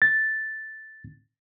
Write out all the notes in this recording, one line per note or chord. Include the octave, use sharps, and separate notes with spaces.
A6